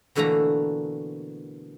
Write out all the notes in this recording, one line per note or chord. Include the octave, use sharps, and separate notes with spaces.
B2 D3 E3 A3 A#3 A#5